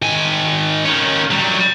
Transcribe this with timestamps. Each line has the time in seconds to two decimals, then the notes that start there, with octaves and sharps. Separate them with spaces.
0.02 D#3 G#5
0.85 D#3 C#4
1.31 F#3 G3